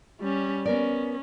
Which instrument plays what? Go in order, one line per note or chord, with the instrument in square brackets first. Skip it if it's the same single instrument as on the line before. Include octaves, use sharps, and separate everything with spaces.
[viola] G3 C#4
[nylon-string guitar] B3 A#4 D5 [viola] C#4